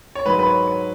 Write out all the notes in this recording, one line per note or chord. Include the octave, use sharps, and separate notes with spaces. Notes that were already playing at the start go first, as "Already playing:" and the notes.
C#5
G#2 D#3 F#3 B4
B4
C#5
C#5